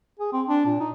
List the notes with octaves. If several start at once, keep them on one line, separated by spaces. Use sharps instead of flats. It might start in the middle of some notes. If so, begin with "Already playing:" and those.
G#4
C4
D4
A#2
D#4